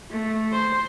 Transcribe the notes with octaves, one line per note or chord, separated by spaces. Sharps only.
A3
C5